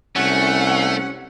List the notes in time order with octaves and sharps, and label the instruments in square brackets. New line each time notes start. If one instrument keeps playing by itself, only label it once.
[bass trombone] C2 [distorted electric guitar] A3 [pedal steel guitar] C#4 [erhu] F#5